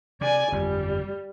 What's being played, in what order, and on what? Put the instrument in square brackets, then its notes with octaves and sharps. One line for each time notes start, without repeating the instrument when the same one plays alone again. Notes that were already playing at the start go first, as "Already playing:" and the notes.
[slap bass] C3 [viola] D5 G#5
[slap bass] G1 F2 F3 [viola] G3